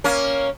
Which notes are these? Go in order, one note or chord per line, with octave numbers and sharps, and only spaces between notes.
A#3 C#4